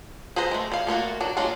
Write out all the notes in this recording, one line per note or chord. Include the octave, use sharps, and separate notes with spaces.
G#4 A4 B4 C5 A#5
G#3 A3
G3 F5
A3 A#3 F4 F#4
F#3 D4
F#3 G#3 A#3 D4 F4